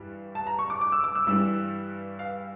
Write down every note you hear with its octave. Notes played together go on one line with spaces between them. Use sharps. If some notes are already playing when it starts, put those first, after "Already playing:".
Already playing: G2 E3 G3
A5
A#5
C#6
D6
D6
E6
D6
E6
G2 E3 G3 E6
F5